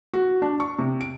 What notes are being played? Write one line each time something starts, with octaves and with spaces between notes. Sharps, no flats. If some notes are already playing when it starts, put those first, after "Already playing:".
F#4
D4
C#6
C3
D7